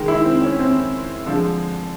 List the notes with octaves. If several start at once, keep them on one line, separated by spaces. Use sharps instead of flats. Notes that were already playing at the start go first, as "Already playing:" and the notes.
Already playing: D#3 G#3
E4
C4
C#4
C4
D3 F3 G#3